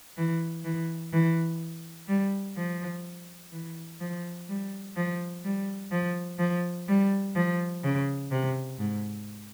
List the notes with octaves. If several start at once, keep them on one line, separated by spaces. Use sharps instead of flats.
E3
E3
E3
G3
F3
E3
F3
G3
F3
G3
F3
F3
G3
F3
C#3
C3
G#2